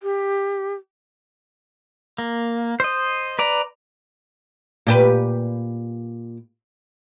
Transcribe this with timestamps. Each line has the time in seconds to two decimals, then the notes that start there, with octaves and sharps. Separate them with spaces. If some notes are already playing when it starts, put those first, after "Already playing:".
0.03 G4
2.18 A#3
2.80 C5 D#5
3.39 B4 D5 A#5
4.87 A#2 G4 B4